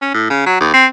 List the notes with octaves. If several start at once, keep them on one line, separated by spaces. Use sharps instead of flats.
C#4
A2
C#3
F#3
D#2
C4